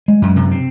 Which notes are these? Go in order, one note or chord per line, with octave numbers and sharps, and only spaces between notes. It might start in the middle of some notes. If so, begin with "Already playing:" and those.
G#3
F#2
C3
C4